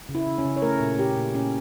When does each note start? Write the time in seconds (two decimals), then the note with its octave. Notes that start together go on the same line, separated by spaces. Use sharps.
0.09 C#3
0.15 E4
0.27 C#3
0.38 C#4
0.45 C#3
0.56 C#5
0.62 A3 A#4
0.80 A#2
0.98 A#2 G4
1.16 A#2
1.34 A#2 C#4